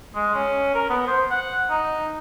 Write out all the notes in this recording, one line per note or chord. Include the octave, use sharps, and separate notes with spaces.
G#3
C#4
A#4
B3
C5
F#5
D#4